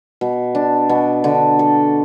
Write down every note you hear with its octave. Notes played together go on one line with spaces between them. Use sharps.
B2
D4
B2
D3
A4